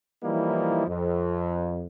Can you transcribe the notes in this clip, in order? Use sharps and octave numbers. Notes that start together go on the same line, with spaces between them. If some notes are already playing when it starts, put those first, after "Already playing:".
E3 F3 G3 A#3 D#4 E4
F2